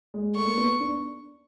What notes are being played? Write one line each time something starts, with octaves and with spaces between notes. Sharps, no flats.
G#3
A3 C#6
A#3
B3
D4